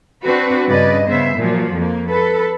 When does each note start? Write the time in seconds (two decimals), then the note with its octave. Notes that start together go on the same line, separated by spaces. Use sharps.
0.24 C4 D4 F#4 B4
0.68 G2 C#3 B4 D5 D#5
1.07 C#3 B3 C5 E5
1.36 A#2 F3 F#3
1.74 F2 A#3
2.09 A4 B4